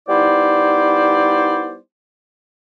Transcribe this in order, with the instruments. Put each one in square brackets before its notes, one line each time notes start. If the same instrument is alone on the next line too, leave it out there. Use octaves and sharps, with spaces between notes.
[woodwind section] G3 B3 D#4 E4 C5 D5